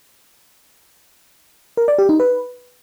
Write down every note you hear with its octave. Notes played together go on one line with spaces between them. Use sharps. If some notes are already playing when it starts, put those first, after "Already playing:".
A#4
D5
G4
D#4
B4